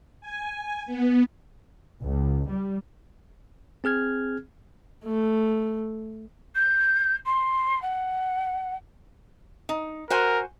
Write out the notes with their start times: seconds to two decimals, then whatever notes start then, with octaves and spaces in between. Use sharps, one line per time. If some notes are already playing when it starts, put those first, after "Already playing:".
0.21 G#5
0.86 B3
2.03 C#2
2.50 G3
3.84 C4 G#4 F6 G#6
5.05 A3
6.55 G6
7.25 C6
7.81 F#5
9.69 D#4
10.10 F#4 A#4 C5 G#5